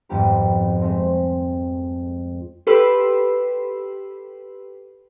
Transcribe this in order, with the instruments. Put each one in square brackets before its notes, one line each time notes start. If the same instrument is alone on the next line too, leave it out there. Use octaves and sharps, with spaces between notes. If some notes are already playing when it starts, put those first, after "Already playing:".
[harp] G#1 F2 G3 B3 G4 A#4
G#3 A3 C4
[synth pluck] G4 A4 B4 B5 C6 E6